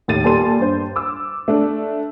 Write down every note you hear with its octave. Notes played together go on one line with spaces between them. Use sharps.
D#2 A2 A6 D#7
A#2 G3 A4 C6 D#7
G2 C5
D6 E6
A3 D4